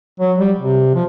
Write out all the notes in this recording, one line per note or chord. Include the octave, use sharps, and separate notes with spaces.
F#3
G3
C3
F3